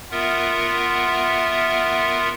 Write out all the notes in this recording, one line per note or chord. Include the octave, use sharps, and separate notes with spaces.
B3 F4 A#4 E5 F#5